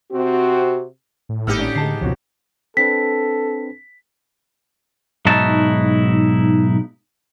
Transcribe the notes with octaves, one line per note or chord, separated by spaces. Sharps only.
C3 C4 F#4
A2
G#1 G#2 A#3 B3 D#4 G4 E6 F6
C#4 D4
D3 G#3 A5 C7
C#2 F#2 B2 F3 C4 F#4 C#5
C4 D4 A4 B4 B6
B1 G#2 D#4 E4 F#4 A5